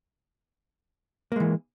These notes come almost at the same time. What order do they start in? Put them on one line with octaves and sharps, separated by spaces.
A#3 G#3 E3